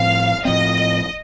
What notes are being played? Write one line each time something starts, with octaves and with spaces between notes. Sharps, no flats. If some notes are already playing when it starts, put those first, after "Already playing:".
Already playing: A2 F3 C4 F5
A2 F3 C4 D#5